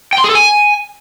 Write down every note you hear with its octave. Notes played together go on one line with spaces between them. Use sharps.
G5
C6
G#4
A4
G#5